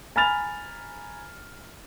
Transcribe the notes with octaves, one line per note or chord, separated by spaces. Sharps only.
G#5 A#5 B5 F6 A6 F7